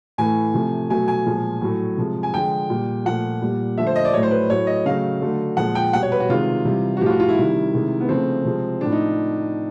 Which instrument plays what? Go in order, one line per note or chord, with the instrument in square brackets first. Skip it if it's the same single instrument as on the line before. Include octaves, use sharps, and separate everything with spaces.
[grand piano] A2 E3 A3 G#5
C3 F3 A3
B2 F#3 A3 G#5
G#5
A#2 F3 G#3
A2 F#3 A3
C3 F3 G#3
G#5
D3 F3 G#3 G5
A#2 G3
A#2 F3 A3 F#5
A#2 G3
D3 F3 A3 E5
C5
D#5
D5
A2 F#3 A3 C#5
C5
B4
A2 F#3 A3 C#5
D#5
C#3 F#3 A3 F5
D3 F#3 A3
A#2 F3 G#3 F#5
G5
B2 G3 F#5
C#5
B4
F#4
C3 D#3 G#3 F4
C3 E3 G3
F#4
A2 F3 A3 F4 G4
F#4
F4
E4
C3 D#3 G3
C3 D#3 G#3
B3
C#3 F3 A3 C4
C3 F3 G#3
A2 F3 A3 D4
D#4